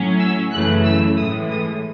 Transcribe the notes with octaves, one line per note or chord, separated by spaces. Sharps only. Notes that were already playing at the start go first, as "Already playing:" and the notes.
Already playing: A2 F#3 C#4
E6
F#2 C#3 E3 A3 F#6
E6
A2 E3 G#3 D#6
D#6